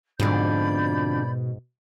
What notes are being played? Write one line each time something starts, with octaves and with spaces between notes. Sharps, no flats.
F2 G#2 B2 D3 D5 B5 G6